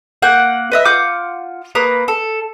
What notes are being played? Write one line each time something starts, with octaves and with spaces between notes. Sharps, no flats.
A#3 F#5 F#6 G6
B4 D#5 E5
F4 F#5 D6 G6
A#3 B4 A#5 D#6
A4